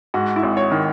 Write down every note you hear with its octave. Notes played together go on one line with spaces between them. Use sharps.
G#2 F#4
E4
G#1
C#5
D#3